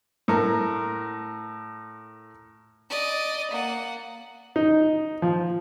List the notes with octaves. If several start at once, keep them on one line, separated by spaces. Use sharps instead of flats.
A2 A#4
D5 D#5
A#3 F#5
D#4
F3